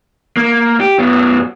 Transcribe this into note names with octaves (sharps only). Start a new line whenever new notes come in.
A#3
G4
F#2 B3